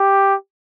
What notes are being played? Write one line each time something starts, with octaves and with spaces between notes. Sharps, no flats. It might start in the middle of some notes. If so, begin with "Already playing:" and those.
Already playing: G4